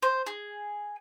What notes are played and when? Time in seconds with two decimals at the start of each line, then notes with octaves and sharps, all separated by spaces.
0.02 C5
0.26 G#4